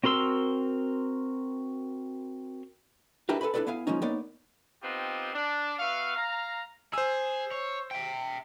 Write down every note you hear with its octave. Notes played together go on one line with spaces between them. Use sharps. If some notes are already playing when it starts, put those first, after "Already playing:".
C4 F#4 A#4 C6 E6
D4 E4 G4 A#4 B4
A4 B4 G#5 B5
D4 E4 F#4 A4 B4 D5
B3 E4 F5 G#5
F3 G#3 A#3 C#4 D#4
A#3 B3 D#4 C#5 D5
B3 C4 D#4 F4 G4 D#5
D4
B3 F#4 E5 F5
F5 A#5
G#4 C5 E6
C#5
E5 G5